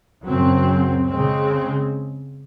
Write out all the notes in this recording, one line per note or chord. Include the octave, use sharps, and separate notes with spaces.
F#2 C#3 F#3 C4
C#3 G#3 C4